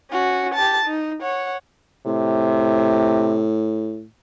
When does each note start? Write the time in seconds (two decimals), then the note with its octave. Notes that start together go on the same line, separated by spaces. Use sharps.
0.11 C#4 F#4
0.55 G4 A5
0.86 D#4
1.21 C#5 F#5
2.06 A2 C3